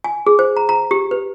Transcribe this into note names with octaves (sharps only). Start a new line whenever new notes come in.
G#5
G#4
C5
A#5
A#5
G4
B4